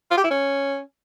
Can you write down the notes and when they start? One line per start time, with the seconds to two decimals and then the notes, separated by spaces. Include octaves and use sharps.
0.11 F4
0.17 G4
0.24 E4
0.30 C#4